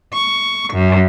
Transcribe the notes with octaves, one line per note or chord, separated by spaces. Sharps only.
C#6
F#2